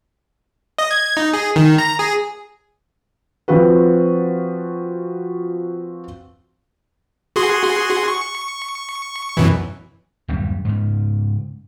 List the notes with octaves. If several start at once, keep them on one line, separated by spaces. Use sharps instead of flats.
D#5
G#6
D#4
G#4
D#3
A#5
G#4
F3 C4 F4 F#4 B4
F#4 G#4 C6
C#6
F#2 B2 E3
D1 F#2 A#2 G3
G#2 C#3